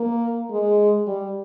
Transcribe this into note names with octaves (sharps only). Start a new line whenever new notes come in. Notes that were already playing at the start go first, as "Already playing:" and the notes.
Already playing: A#3
G#3
G3